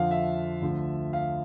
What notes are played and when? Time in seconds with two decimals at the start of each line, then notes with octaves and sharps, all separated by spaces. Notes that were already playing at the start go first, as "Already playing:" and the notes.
Already playing: F2 D3 F3 F5 F#5
0.11 E5
0.61 D2 D3 F3
1.13 F5